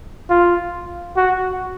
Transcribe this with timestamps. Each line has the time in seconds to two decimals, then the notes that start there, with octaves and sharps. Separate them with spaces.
0.30 F4
1.17 F#4